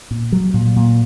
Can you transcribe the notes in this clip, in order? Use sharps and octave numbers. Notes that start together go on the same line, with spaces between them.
A#2
F#3
A#2
A#2